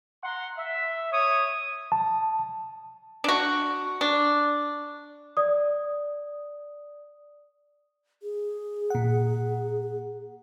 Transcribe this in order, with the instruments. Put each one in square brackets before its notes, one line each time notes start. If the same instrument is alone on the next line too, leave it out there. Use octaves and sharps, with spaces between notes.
[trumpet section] F#5 A#5 C6
E5
C#5 D#6
[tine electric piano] A5
[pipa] D4 F#4
D4
[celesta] D5 D#6
[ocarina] G#4
[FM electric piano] A#2 F#5